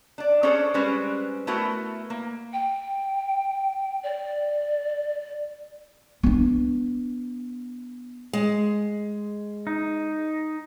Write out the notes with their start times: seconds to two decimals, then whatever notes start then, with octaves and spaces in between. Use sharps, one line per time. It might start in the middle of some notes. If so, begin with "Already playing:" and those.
0.18 D4 D5
0.43 C#4 D4 G#4 A4 C5 D5
0.74 G3 G#3 C4 C#4 B4 C5
1.47 A3 B3 E4 F#4 A#4
2.10 A#3
2.53 G5
4.03 D5
6.23 B3 D4
8.33 G#3
9.67 D#4